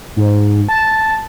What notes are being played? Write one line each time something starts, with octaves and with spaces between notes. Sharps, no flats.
G#2
A5